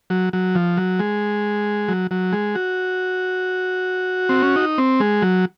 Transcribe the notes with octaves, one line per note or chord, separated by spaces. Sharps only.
F#3
F#3
F3
F#3
G#3
F#3
F#3
G#3
F#4
C4
C#4
D#4
C4
G#3
F#3